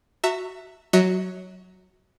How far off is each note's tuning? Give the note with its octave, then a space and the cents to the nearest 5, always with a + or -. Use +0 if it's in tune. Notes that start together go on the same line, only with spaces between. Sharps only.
F#4 +0 E5 +0 A#5 -40
F#3 +0 F#4 +0 E5 -45